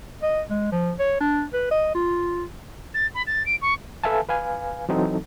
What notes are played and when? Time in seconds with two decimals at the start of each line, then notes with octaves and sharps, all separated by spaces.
0.23 D#5
0.50 G#3
0.72 F3
0.99 C#5
1.21 D4
1.53 B4
1.71 D#5
1.95 F4
2.94 A6
3.14 B5
3.27 A6
3.46 D7
3.61 C#6
4.04 A4 B4 E5 F5 G#5 A5
4.29 B4 F5 G#5
4.89 E3 F#3 C4 D#4 A4